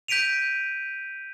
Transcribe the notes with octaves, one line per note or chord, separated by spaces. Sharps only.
G6 B6 D7 D#7 F7